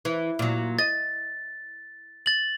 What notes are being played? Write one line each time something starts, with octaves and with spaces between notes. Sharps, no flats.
E3
A#2 F#3
D#5 A6
A6 F#7